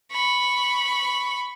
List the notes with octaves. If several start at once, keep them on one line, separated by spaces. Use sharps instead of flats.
B5 C#6